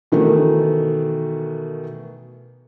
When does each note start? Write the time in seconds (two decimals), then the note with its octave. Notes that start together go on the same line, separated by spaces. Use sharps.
0.12 B2 D#3 E3 A3